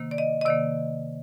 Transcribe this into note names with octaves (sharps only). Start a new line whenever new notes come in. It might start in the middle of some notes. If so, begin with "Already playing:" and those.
Already playing: C3 D#3 A#3
D5
D#5
D#5
C3 D#3 A#3 D5